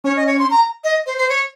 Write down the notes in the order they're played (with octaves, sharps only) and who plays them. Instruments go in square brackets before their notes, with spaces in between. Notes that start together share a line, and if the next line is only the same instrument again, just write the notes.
[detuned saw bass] C#4 [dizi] C#5
[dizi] D#5
C#5
C6
A#5
D#5
C5
C5
C#5